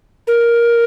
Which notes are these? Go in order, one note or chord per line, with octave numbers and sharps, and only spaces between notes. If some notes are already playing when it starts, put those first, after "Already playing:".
A#4